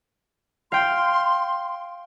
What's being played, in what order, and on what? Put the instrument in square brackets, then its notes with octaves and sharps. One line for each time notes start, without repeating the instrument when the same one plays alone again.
[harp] F5 G5 [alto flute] C6